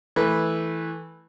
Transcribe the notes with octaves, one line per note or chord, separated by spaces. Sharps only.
E3 A3 B4